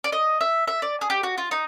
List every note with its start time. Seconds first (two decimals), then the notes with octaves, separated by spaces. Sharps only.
0.04 D5
0.12 D#5
0.41 E5
0.68 E5
0.82 D5
1.01 G#4
1.10 G4
1.23 F#4
1.38 F4
1.51 D#4